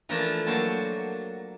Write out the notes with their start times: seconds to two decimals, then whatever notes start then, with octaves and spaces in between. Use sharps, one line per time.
0.09 E3 F3 A3 D4 A#4 A5
0.47 F#3 A#3 A4 C5 A5